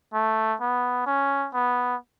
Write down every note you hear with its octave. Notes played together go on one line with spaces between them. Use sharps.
A3
B3
C#4
B3